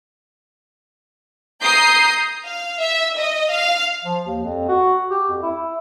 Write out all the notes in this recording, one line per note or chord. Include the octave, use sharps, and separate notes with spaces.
A#5 D#6 G6 C7
F5
E5
D#5
F5
F3
D#2
F2
F#4
G4
F2
E4